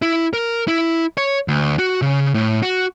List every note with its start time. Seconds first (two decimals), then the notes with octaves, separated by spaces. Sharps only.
0.02 E4
0.33 A#4
0.68 E4
1.17 C#5
1.48 D2
1.79 F#4
2.02 C#3
2.34 A2
2.62 F#4